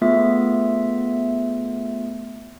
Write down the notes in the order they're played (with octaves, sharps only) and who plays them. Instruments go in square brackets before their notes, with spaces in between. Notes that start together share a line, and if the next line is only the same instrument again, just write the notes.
[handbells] A3 B3 F4 G#4 E5